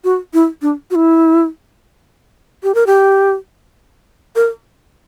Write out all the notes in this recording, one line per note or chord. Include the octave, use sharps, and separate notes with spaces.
F#4
E4
D4
F#4
E4
G4
A#4
G4
A#4